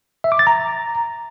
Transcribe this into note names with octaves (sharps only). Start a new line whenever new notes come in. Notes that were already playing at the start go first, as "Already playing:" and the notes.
E5
D6
A6
A#5